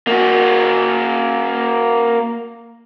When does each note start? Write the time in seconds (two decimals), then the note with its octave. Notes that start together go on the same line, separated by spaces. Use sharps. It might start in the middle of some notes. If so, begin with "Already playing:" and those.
0.07 A#3 F#4